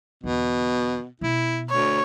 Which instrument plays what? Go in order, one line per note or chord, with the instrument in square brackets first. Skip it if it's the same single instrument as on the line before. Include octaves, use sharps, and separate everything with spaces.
[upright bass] E2 D3 [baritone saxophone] B2
[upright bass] B2 [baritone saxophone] E4
[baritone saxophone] D2 [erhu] C#5